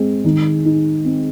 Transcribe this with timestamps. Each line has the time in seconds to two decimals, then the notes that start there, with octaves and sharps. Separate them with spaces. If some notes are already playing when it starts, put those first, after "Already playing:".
Already playing: G#3 C4
0.24 D#3
0.65 D#4
1.05 C4